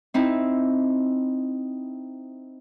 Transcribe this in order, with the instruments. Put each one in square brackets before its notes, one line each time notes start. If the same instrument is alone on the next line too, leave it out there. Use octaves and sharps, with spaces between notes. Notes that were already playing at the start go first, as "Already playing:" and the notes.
[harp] C4 D#4 E4